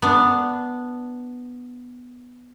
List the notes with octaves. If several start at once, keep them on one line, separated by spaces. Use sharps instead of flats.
B3 D4